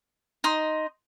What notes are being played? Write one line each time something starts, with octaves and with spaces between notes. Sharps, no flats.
D#4 D#5 C6